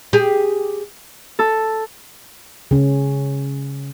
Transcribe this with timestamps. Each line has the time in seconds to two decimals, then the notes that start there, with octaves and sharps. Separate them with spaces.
0.13 G4 G#4
1.39 A4
2.71 C#3 C#4